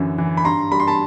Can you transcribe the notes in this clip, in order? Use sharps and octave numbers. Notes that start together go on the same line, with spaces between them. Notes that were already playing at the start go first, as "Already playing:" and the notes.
Already playing: F#2 D3 E3
E3
B5
G2 A#5 C6
G3 B5
C6
A5 B5